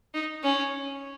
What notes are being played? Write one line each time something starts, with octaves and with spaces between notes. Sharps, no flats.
D#4
C#4